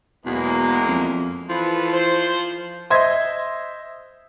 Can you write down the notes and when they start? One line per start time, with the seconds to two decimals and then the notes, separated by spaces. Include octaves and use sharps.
0.26 E2 B2 F#3 G#3 A#3
0.88 F2
1.50 E3 F3 A4 B4
1.91 C5
2.90 C5 D#5 E5 C6 G#6